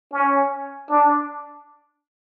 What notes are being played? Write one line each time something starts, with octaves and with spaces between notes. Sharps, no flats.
C#4
D4